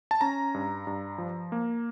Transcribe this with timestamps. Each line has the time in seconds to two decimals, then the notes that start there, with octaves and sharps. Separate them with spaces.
0.11 A5
0.21 C#4 A#5
0.54 G2
0.87 G2
1.18 F3
1.52 A#3